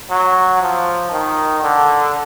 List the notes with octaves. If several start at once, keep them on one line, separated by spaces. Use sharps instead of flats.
F#3
F3
D#3
D3